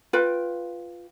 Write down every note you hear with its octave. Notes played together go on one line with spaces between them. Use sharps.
F4 B4 G5